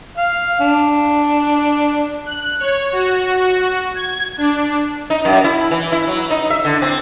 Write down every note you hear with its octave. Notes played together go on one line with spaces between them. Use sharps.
F5
D4
F#6
C#5
F#4
F#4
G#6
D4
D#4
F#2
E4
E3
E4
F#3
D#4
E5
D3
C4